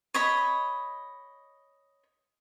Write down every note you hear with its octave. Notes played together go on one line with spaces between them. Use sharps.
C#5 D#5 B5